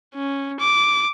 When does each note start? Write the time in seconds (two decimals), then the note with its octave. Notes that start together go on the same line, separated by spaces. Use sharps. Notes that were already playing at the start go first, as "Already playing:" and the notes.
0.15 C#4
0.60 D6